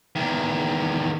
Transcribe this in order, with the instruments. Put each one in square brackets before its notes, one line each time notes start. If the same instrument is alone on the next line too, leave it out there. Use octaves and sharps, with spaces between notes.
[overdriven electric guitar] E2 D#3